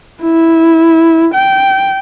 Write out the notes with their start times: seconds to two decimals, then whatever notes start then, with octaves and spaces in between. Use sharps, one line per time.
0.23 E4
1.34 G5